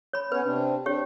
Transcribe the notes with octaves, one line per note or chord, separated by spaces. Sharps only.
C#5 B5
B3 C#4 B4 C#5 B5
C3 C4 D4
C4 D4 G4 C#5